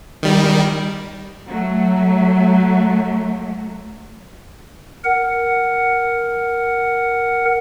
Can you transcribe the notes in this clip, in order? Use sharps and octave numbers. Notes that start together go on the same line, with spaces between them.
D#3 G3
F#3 A3
A#4 F#5